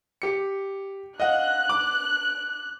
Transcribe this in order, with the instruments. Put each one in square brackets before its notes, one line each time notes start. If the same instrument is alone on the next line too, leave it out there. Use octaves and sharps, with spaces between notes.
[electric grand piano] G4 C#7
[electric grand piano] D#5 F5 F#5 [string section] F#6
[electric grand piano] D6